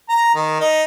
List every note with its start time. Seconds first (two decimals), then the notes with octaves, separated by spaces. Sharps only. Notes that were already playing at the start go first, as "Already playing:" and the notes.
0.09 A#5
0.35 D#3
0.61 D#4